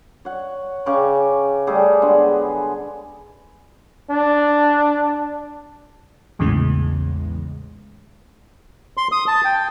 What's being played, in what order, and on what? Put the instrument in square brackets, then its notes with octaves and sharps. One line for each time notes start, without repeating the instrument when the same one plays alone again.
[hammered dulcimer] C#5 F#5
C#3 G5 C#6 D6
G3 A3 G4 G#4
D3 G#3 B3
[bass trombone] D4
[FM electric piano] A#1 E2 A2 C#3 E3 G#3
[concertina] C6
D#6
A5
G5